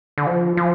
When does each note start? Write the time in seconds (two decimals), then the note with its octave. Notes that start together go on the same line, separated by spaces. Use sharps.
0.18 D3
0.27 F3
0.57 F3